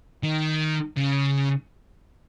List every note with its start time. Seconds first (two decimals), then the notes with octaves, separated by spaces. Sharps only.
0.23 D#3
0.97 C#3